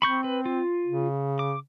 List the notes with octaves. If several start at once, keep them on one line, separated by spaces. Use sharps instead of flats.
C4 B5 C#6 G6
B4
F4
C#3
D6